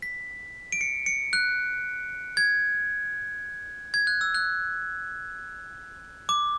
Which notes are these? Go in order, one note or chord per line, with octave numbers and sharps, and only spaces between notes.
B6
D7
C#7
C#7
F#6
G#6
G#6
F#6
E6
F#6
D6